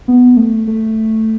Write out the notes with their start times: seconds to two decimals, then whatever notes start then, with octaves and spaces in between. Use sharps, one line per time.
0.08 B3
0.37 A3
0.67 A3